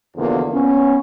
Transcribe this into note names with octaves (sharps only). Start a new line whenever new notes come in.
E2 B2 D3 F3 A#3
B3 C#4